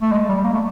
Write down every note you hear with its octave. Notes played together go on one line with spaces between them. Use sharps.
A3
G#3
G3
A#3
A3